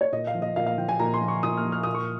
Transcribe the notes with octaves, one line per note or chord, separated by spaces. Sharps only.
C#5
A#2 D#5
F5
F3
D#5
A#2 F5
F5
F3 G5
G#5
A#2 A#5
C6
F3
C#6
A#2 D#6
F6
F3
F6
A#2 D#6
C#6